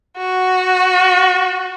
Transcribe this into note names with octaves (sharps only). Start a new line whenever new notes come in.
F#4